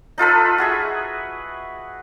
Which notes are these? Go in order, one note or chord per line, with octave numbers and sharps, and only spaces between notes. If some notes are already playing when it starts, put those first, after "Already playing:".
D#4 F4 A4 B4
F#4 G#4 E5